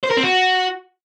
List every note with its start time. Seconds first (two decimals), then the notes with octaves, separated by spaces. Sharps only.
0.03 C5
0.10 A#4
0.17 C4
0.23 F#4